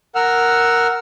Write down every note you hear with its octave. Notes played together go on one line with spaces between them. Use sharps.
A#4 F#5 E6 F6